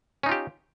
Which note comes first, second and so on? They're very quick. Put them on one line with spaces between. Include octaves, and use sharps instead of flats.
C#4 D#4 F4 G4